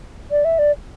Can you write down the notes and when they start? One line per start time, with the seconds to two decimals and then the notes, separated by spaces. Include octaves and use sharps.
0.31 D5
0.45 E5
0.59 D5